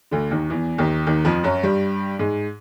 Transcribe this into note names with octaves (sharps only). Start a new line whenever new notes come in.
D2 D3
D#2 D#3
E2 E3
D#2 D#3
D#2 D#3
F2 F3
F#2 F#3
G2 G3
G#2 G#3